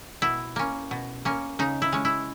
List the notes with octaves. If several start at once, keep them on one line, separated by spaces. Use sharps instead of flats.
B2 E4
A#3 C#4
B2
A#3 C#4
C#3 D#4
E4
G#3 C#4
E4